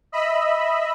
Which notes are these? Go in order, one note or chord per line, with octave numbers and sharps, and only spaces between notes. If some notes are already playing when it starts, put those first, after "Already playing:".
D#5 E5 B5